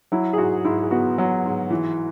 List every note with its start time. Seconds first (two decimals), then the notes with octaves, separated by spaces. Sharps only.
0.12 F#3 E4
0.33 G#4
0.38 G#2 F#4
0.65 G#2 E4
0.81 G#4
0.91 B3 F#4
1.18 F#3
1.45 G#2
1.70 E3